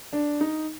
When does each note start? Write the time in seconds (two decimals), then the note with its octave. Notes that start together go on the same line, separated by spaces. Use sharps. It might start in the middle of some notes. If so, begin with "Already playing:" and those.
0.13 D4
0.41 D#4